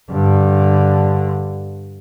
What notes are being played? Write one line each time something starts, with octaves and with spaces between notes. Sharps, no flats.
G2 D3